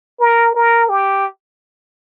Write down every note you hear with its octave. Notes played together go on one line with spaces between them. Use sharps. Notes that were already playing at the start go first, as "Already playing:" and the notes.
A#4
A#4
G4